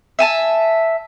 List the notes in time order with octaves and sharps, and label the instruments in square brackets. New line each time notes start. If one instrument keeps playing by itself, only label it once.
[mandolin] E5 G#5 A5